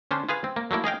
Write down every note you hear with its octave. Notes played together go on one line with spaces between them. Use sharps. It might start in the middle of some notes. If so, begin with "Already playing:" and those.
D3 C#4 D4 C5
F4 G#4 B4 F5
C4
A#3
F#3 A3 A#3 E4
G#4 D#5 F5 G5